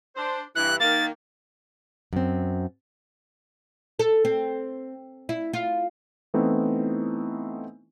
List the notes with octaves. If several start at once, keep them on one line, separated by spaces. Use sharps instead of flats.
D4 C5
G2 E3 F#6
D#3 A#3 A6
F#2 C4
A4
C4
E4
F4
E3 A3 B3 C4 D#4 E4